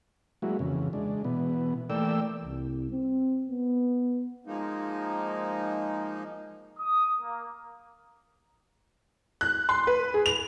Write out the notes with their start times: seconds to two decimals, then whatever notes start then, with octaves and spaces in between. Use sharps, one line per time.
0.42 F#3 G#3 A#3 E4 F#4
0.59 F2 C#3 E3
0.93 G#3 D4
1.24 B2 E3 B3
1.90 E3 A3 A#3 D5 G5 E6
2.44 C2
2.91 C4
3.49 B3
4.47 F3 G#3 A#3 D#4
6.79 D#6
7.21 A#3
9.41 F#6
9.69 C6
9.87 B4
10.14 G#4
10.26 F7